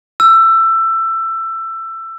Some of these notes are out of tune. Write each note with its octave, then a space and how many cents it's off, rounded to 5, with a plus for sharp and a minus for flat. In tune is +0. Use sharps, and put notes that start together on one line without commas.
E6 +20